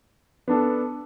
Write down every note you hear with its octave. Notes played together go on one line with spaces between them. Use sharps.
B3 D4 A4